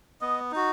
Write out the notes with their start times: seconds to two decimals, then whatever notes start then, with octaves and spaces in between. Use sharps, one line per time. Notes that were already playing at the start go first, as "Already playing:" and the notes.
0.21 B3 D#5
0.52 D#4 F#4